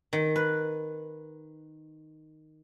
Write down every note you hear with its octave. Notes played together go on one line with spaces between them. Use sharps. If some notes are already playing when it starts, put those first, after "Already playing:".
D#3
B4